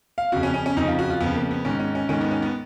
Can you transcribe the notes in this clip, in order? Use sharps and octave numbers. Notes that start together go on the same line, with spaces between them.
F5
F2 C#3 F#4
C#4
C#4
C#4
F2 C#3 D#4
F4
F#4
F4
F2 C#3 B3
A#3
B3
G#2 D#3 C#4
C#4
C#4
G#2 D#3 C#4
B3
C#4
B3